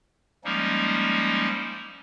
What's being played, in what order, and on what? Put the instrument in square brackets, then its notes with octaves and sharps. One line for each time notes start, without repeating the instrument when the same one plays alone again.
[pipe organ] F3 G3 G#3 A#3 C#4 D#4